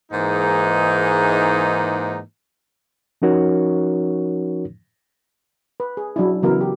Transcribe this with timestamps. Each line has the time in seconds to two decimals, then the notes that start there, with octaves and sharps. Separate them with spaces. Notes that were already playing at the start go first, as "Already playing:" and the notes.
0.11 G#2 E3 G#3 A#3 D#4
3.22 F3 C#4 D#4 F#4 A#4 C#5
5.80 B4
5.97 G#4
6.16 F#3 D4 E4
6.42 C#3 E3 F#3 B3 E4 A#4
6.61 G4